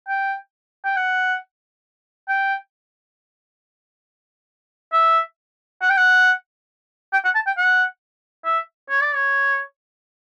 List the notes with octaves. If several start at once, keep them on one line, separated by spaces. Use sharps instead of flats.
G5
G5
F#5
G5
E5
F#5
G5
F#5
G5
F#5
A5
G5
F#5
E5
C#5
D5
C#5